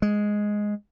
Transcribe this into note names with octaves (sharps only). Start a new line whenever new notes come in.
G#3